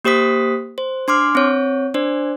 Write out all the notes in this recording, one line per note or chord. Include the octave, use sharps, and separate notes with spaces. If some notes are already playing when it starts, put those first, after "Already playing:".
A#3 G4 C5 D#6 B6
C5
D4 C6 D6 F6
C4 C#5
D4 C5 D5